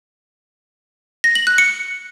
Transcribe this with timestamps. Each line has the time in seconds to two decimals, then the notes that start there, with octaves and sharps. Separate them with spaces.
1.24 A#6
1.35 F#7
1.47 F#6
1.58 C#7